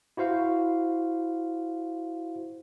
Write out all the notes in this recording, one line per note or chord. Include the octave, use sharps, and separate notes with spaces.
E4 F#4 C5 F5